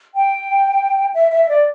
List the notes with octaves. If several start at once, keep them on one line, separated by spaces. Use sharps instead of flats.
G5
E5
E5
D5